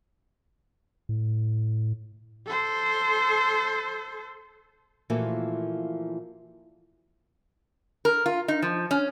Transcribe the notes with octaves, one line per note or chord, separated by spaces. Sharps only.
A2
A4 C5
A#2 E3 F3 A3 A#3 F#4
A#4
F4
D#4
F3
C#4